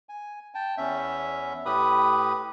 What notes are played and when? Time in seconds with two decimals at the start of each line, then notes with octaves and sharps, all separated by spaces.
0.09 G#5
0.55 G5 A5
0.77 E2 C#4 E5
1.66 A2 G4 B4 B5 D#6